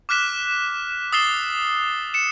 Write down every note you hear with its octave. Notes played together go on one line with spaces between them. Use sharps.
D6 F6 F#6 B6 E7
D#6 E6 A6 C7 E7 G7
C#7 E7